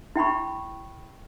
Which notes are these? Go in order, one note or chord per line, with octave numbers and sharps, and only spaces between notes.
E4 G5 B5 C#6